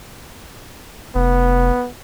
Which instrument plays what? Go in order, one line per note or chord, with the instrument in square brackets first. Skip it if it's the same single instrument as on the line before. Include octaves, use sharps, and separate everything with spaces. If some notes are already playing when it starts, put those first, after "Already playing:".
[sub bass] F1 [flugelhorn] B3